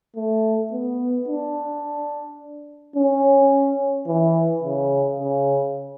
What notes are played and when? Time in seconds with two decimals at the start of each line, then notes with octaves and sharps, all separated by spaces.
0.16 A3
0.72 B3
1.28 D4
2.96 C#4
4.07 E3
4.63 C#3
5.19 C#3